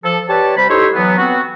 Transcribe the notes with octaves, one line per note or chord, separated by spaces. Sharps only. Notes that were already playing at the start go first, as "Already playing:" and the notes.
F3 A4
G4 B4 C#5 D5 A5
C3 G3 C5 B5
D#4 E4 G4 A4 C5 C#5
E3 F#3 B3
B3 C4 F#4